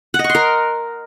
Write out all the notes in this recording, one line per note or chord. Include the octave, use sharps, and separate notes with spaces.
F#5
D#5
C#6
C6
A#4